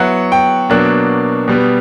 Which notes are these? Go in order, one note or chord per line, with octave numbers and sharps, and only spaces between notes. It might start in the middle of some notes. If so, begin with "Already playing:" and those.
Already playing: F#3 B3 E4 F#5
G5
B2 F#3 A#3 D4 F#6
B2 G3 B3